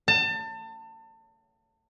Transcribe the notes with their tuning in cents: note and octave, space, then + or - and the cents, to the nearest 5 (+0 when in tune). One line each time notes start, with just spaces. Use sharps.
A5 +30